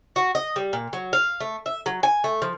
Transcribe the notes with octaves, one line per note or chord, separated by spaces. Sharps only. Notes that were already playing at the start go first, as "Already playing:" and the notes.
F#4
D#5
G3
A#2
F#3
F5
A3
E5
F#3
G#5
A3
F3